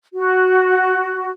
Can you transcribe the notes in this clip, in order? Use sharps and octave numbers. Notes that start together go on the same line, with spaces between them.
F#4